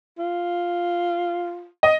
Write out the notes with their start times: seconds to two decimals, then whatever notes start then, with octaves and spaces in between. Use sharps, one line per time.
0.18 F4
1.83 D#5